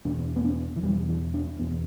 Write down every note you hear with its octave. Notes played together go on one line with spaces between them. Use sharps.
E2 B2 D4
B3
D4
E3
E2 B2 G3
E3
D4
E2 B2 B3